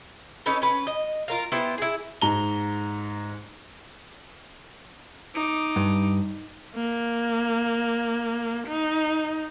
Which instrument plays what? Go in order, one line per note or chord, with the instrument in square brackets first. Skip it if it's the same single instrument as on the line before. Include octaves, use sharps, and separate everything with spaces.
[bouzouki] C#4 D#4 A4 B4
C#4 B4
D#5
F4 A#4 F5
B3 E4 G4 C5
E4 G#4
[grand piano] G#2 A#5 G7
[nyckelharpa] D#4 D6
[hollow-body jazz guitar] G2
[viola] A#3
D#4